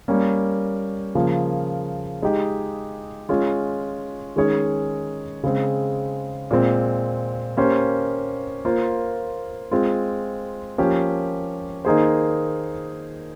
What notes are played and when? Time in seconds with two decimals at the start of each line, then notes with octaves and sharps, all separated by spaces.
0.08 G3 A#3 C#4
1.15 C#3 F3 A#3
2.22 G#3 D#4 G4
3.29 G#3 C#4 F4
4.36 D#3 G#3 C#4 G#4 C#5
5.44 C#3 G#3 C4
6.51 A#2 G#3 C4
7.57 A#3 C#4 G4 C5
8.65 A#3 F4 C5
9.71 G#3 C4 F4
10.78 F3 A#3 C#4 G4
11.85 D#3 A#3 D#4 G#4 C5